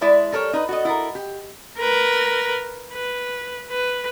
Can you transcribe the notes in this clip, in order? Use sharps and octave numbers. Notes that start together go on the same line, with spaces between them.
G#3 E4 D5 E5 A5
G3 A4 A#4 C#5
D#4 B4
F#4 A4 D#5
E4 A4 A#4
G4
A#4 B4
B4
B4